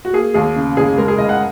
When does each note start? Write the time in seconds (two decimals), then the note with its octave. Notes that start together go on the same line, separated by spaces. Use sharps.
0.05 F#4
0.13 A#3 G#4
0.34 D#2 G#4
0.56 C#3
0.77 F#1 G#4
0.97 G#3 A#4
1.08 G#4
1.18 C#2 D#5
1.29 F#5